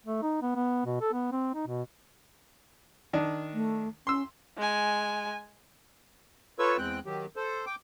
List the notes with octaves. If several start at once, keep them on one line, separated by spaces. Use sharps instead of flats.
A3
D#4
B3
B3
B2
A4
B3
C4
D#4
B2
D#3 D4
A3
C#4 C6 E6
G#3 G#5
F4 A4 B4 C#5 C#6 E6
E2 G#3 C4 G5 F#6
D#3 F#3 G4
A4 C5
G5 D6